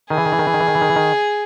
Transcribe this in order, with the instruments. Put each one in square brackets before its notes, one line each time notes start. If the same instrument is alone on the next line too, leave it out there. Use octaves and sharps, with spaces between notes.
[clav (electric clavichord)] D#3 [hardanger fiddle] G#4
[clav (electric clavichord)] E3
D#3
E3
D#3
E3
D#3
E3
D#3
E3
D#3
E3
D#3